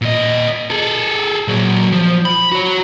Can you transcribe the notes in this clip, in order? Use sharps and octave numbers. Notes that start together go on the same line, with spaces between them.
A#2 D#5
G#4 A4
A#2 F#3
F3
B5
F#4 C#5